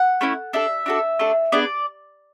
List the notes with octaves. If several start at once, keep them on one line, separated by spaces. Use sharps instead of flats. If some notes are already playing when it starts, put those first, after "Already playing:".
Already playing: F#5
A3 C#4 E4
D4 A4 E5
D4 F#4 A4
A3 D4 A4
B3 D4 G#4 D5